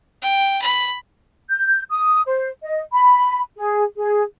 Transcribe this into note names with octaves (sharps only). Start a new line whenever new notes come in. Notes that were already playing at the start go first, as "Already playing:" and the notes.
G5
B5
G6
D#6
C5
D#5
B5
G#4
G#4